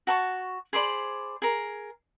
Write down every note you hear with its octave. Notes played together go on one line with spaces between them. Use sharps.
F#4 A5 C#6
G#4 C5 D5 B5
G#4 A#4